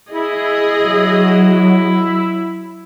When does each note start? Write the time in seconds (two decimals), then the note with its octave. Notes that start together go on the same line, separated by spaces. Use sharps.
0.12 E4 G#4 D#5
0.80 F#3